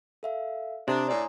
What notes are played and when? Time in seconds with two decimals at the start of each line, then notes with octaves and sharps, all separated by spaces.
0.23 A4 E5 F5
0.88 C3 D4 A#5 C6 D#6
1.08 A2 D4 C#5 D5 G#5 A#5